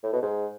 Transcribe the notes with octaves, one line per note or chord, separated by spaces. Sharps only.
A2
B2
G#2